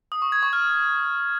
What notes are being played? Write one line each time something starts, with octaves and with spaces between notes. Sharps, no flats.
D#6
C#6
G#6
C#6
F6